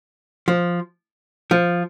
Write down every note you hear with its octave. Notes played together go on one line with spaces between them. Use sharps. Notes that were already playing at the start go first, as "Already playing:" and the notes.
F3
F3